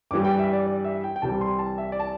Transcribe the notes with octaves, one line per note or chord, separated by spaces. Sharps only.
G2 E3 G3 D6
G5
E5
D5
D5
E5
G5
G5
C2 C3 E3 G3 A5
C6
A5
E5
D5
A5